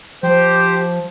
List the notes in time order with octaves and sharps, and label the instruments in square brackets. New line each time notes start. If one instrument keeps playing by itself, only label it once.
[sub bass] F3 [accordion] G4 C5